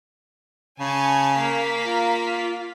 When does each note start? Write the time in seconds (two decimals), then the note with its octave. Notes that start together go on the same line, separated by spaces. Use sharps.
0.80 C#3 G#5 A5 C#6
1.33 A#3 F5 B6
1.84 F4